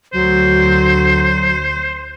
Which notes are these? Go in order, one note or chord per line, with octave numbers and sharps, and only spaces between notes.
D2 F#3 C5